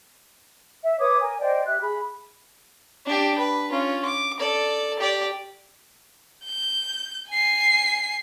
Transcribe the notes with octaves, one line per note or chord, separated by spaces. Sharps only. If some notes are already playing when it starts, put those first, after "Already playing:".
E5
B4 C#5 D6 D#6
A#4 G#5
C5 D5 D#5 G5
G4 E5 F#6
G#4 B5
D4 G4
B4
C#4 F4
D6
A4 D5
G4 D5
G6
G#5 C7